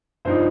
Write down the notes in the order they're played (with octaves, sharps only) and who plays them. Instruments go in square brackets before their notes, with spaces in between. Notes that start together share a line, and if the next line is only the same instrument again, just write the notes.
[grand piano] G2 F3 D#4 C5